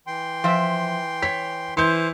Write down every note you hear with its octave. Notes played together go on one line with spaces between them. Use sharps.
E3 G5 C6
F3 E5
C#5 B6
E3 C5 C6 G6